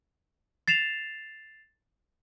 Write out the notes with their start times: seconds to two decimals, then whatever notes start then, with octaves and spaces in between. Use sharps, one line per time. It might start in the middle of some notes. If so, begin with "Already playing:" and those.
0.68 A6 C7 E7 F7